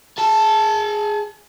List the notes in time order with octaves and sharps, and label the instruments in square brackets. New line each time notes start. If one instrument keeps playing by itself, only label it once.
[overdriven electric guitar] G#4 A5